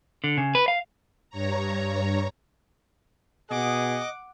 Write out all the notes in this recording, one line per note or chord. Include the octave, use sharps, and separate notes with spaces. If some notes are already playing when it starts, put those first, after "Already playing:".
D3
C#3
B4
F5
G2 C#5 A#5
B2 G#4 D#5 F#5 D6